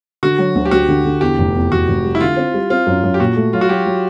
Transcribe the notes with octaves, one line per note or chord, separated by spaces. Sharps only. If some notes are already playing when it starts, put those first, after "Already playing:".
D3 F#4
F#3
D2
G4
D2 F#4
D3
D3
E2 G4
F1
E2
F1 F#4
F1
G3
E4
D3 F4
C4
G3
C4 F4
F#2
F#2
G4
A#2 F#4
A3
F#3 F4
F#4
F#3 G4
F#3